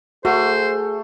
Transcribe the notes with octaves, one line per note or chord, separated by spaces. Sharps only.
A3 F#4 G#4 C5